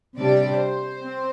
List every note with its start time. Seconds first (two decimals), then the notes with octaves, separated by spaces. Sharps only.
0.18 C3 G3 D4 D5
0.60 C5
1.02 C4